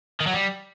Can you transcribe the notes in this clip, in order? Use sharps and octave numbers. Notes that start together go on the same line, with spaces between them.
D#3
F#3
G3